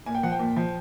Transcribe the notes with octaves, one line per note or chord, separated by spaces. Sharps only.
A#2 G#5
G5
F3 F#5
G5
A#2
F3